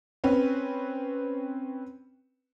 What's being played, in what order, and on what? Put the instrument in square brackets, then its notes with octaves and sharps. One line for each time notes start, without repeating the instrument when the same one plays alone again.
[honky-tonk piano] C4 C#4 B4